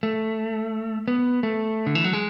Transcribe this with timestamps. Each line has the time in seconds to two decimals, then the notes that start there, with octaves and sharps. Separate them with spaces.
0.03 A3
1.08 B3
1.43 A3
1.87 D3
1.95 E3
2.04 F#3
2.13 G#3